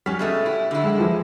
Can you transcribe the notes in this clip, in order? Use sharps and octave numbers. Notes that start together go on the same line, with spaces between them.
F#3 G3 C#4 F6 B6
B2 G#3 A3
E4
D3 E4
G#3 G5
E3 F3 G#3